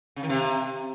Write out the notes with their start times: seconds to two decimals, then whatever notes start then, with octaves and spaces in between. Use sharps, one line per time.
0.16 C#3
0.23 D#3
0.29 C3